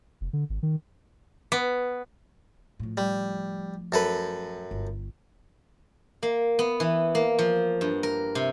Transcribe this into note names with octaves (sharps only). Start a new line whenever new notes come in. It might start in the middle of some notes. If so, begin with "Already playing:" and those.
F1
D3
G#1
D#3
B3
A2 F3
G3
F#2 A4 B4
G1
A#3
B3
E3
A#3
F3
G2
A#4
C3